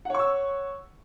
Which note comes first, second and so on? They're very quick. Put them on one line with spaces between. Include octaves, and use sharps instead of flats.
F#5 C#5 C#6 E6